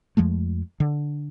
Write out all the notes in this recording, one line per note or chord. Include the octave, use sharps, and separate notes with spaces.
F2 F3 G#3 A3
D3